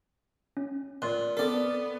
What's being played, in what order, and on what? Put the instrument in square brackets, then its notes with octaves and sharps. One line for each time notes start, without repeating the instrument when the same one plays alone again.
[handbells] C#4
[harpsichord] A#2 [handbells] D5 C6 F#6
[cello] B3 [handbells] C4 A#4 [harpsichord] A4 D5